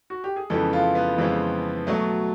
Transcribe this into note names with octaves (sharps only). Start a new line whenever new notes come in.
F#4
G4
G#4
F2 C#3 E3 G#3 B3 A4
F4
B3
F2 C#3 E3 G#3 B3 C4
B2 F#3 A3